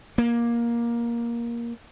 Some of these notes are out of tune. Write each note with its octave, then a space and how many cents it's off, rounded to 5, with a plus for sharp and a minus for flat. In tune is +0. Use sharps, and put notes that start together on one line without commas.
A#3 +15